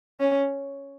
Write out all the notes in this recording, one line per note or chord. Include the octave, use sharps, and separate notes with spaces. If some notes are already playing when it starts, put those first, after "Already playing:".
C#4